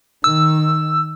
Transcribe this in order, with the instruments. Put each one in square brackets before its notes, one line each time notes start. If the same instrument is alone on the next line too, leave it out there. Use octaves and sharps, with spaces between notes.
[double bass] D#3 [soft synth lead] E6